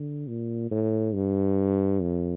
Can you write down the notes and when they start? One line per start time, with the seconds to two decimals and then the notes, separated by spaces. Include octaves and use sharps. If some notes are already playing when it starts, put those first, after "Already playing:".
Already playing: D3
0.27 A#2
0.71 A2
1.14 G2
2.01 F2